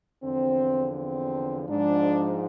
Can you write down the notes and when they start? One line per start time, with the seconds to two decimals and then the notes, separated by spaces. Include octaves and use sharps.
0.24 E2 D3 F3 C4
0.96 C4
1.69 G#2 F3 D4